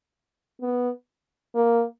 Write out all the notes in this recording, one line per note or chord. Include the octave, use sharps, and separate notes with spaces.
B3
A#3